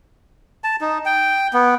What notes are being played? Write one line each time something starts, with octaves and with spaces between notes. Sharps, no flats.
A5
D#4
G5
B3